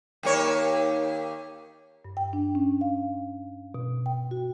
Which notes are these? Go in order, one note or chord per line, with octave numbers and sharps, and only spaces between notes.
D#2 A#3 C#5
G2
G5
D4
C#4
F5
B2
G5
F#4